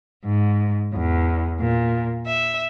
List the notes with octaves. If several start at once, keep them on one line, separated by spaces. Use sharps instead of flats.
G#2
E2
A#2
E5